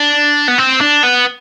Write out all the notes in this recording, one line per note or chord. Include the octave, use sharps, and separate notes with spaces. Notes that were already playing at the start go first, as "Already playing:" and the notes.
Already playing: D4
B3
C4
D4
B3